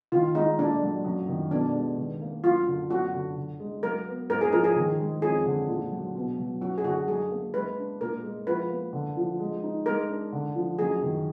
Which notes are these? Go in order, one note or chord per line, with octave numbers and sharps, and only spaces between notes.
D#3 F4
G#3 D#4
A#2 D4
F#3
F#2
D#3
B2 D4
G#3
D#3
A#3
F#2 F4
D3
F#2 F#4
D3
D3
G#3
F#3 A#4
B3
G#2 A#4
G#4
F3 A#4
G#4
D#3
G#3
F2 G#4
D3
A#2
F#3
B2
F#3
F#2 F#4
G#4
D3 F#4
F#3 G#4
A#3
G#3 B4
D4
A#2 A#4
G#3
F3 B4
A#3
D3
F3
G#3
D#4
G#3 A#4
D4
D3
F3
F#2 G#4
D#3